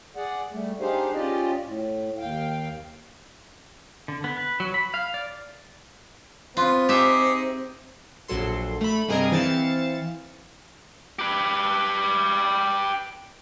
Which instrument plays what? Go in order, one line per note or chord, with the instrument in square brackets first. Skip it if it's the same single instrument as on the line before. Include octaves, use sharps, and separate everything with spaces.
[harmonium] G#4 D5 F#5
G3 A3
D4 D#4 G4 G#4 C5 F5
C#4 F4 G4 D5 D#5
A2
D#2 F5 G5
[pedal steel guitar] D3
B3
B4
F#3
B5
F5
D5
[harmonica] B3 B4 [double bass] C4 [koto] F4
[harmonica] D#4 G#4 D6 [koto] G4 E5
[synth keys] A#1 F#3 A4 C6
A3 B5
G2 C3 G#4 A#4 D#5 G#6
E3 C4 F5 A6 C#7 E7
[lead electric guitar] G4 B4